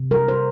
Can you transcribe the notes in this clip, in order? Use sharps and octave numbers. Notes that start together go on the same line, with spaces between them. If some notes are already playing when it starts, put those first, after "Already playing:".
Already playing: C3
G3 A#4
C5